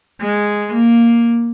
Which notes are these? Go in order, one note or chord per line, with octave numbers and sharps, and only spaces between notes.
G#3
A#3